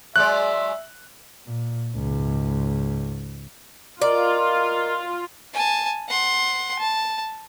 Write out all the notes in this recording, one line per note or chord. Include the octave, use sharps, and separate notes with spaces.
F#3 G#3 D5 E5 F#6
A#2
C#2 G#2
F4 A#4 D5 D#5 A#5
G#5 A5
F#5 C6
A5